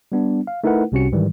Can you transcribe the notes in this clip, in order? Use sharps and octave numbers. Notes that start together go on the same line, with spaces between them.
G3 B3 D4
F5
A3 D#4 E4 A#4 B4 F#5
C2 C3 C#4 F#4 C#7
G#2 D#3 E3 G3